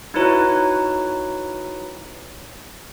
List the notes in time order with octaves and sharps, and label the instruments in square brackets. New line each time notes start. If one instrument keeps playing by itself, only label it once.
[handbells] D#4 E4 F#4 B4 C#5 A#5